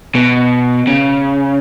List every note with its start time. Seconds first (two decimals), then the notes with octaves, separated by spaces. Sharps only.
0.15 B2
0.88 C#3